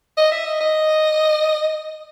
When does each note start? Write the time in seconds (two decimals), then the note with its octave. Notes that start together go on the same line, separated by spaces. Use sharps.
0.17 D#5
0.32 E5
0.46 D#5
0.61 D#5